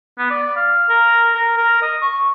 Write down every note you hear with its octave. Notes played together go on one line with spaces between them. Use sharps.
B3
D5
F5
A#4
A#4
A#4
D#5
C#6